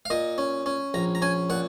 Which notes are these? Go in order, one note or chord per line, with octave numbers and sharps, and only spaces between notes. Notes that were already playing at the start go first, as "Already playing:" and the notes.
F5
A#2 D#5
C#4
C#4
A#1 A#5
A#5
C#4 G#5
A#2 F#5